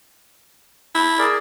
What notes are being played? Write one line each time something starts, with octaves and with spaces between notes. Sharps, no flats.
E4
G#4 A#4 D5